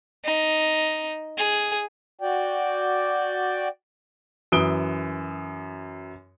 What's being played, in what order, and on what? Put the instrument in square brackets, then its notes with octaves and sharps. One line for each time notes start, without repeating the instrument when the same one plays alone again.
[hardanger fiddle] D#4
G#4
[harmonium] F#4 D5 G5
[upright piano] F#2 E3 D#6 D7 G7